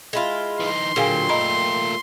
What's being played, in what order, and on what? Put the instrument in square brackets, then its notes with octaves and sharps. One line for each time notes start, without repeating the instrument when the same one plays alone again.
[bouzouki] G#3 E4 F4
[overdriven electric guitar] E3 D#4 [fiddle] C6
[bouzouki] A#2 G5 [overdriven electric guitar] D3 F#3 [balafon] G#4 F5 G#5
[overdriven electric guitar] A3 F4 [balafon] D#5 A#5 B5